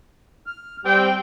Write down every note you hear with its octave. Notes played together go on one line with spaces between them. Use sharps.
F6
G3 C4 G4 G5